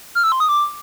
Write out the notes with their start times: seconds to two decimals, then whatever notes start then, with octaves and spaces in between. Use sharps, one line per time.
0.15 F6
0.23 E6
0.32 C6
0.40 D#6
0.49 D6